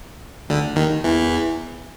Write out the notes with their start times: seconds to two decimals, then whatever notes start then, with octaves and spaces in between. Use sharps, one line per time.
0.49 D2 D3
0.76 D#2 D#3
1.04 E2 E3